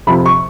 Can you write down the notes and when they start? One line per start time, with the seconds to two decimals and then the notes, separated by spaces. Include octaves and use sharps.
0.07 F2 C3 F3 B5
0.26 C#6